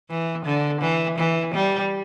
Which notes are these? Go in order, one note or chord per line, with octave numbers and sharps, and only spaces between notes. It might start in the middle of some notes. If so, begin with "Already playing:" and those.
E3
D3
E3
E3
G3